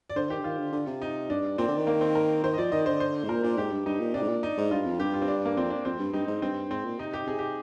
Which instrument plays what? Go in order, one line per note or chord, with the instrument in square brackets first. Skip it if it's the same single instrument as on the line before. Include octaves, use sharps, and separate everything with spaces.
[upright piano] D5
[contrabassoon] D3 [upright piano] C5
[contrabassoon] D#3 [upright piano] G4
[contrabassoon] D3
[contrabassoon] D#3 [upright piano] F4
[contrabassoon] D3
D3
C3
[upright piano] D#4
[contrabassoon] G2 [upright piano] D4
[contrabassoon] A#2 [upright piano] C4
[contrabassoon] D3
D#3
[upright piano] A#3
C4
A#4
[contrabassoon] D#3 [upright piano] C5
[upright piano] D#5
[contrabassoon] F3 [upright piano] D5
[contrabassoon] D#3 [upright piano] D#5
[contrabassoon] D3 [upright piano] C5
[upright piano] C5
[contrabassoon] G#2
[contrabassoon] A#2 [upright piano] A#4
[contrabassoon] A#2 [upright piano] D4
[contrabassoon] G#2 [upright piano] G4
[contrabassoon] G2
[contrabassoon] G2 [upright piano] D#4
[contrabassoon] A#2
[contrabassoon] C3 [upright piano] D4
[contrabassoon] G#2
A#2
[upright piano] D#4
[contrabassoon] G#2
[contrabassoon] G2 [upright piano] F4
[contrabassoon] F2
[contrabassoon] G2 [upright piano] G4
[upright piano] F4
C4
D4
A#3
[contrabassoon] F2 [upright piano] C4
[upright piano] D4
[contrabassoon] F2 [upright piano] C4
[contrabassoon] G2
[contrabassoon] G2 [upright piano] D#4
[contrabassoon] G#2
[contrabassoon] G2 [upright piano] C4
[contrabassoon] G#2 [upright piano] C4
[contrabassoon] A#2
[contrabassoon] C3 [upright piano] D#4
[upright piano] G4
[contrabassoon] C3 [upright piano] G#4
[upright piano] G4